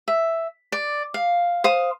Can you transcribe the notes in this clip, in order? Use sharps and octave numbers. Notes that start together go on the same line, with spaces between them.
E5
D5
F5
C5 F5 D#6